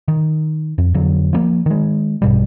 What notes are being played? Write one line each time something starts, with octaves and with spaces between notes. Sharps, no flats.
D#3
F2
F2 D3 F#3
F3 G3 A#3
D#3 G#3
A#1 G2 B2 G3